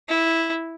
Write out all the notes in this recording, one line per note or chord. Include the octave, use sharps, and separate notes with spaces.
E4